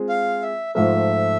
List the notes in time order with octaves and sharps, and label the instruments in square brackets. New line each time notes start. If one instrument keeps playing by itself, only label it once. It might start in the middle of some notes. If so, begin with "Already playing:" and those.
Already playing: [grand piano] G#3 C4 F4 G#4
[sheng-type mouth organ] F5
E5
[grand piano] G#2 F3 A3 [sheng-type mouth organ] E5